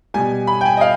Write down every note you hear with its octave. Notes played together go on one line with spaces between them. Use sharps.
B2 G3 G#5
B5
G5
G#5
D#5
F5